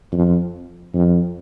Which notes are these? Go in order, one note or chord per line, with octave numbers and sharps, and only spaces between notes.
F2
F2